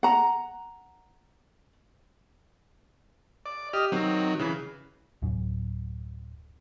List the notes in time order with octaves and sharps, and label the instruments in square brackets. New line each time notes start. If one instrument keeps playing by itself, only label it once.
[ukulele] F#5 A#5
[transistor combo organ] D5
[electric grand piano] G4 [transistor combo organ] D#5 F6
[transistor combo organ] D#3 F#3 [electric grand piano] C4
[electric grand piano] C#3 E3 B4
[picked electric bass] D1 F#2